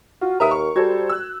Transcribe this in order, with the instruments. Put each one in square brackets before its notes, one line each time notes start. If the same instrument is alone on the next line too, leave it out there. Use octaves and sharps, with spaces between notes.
[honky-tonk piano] F4 [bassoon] F#4
[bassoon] D#2 [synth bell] A#4 A#5 [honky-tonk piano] B4 E5 D#6
[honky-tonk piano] C#6
[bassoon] G3 [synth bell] F#4 [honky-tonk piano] A4 C5 G#6
[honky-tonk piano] E6 F#6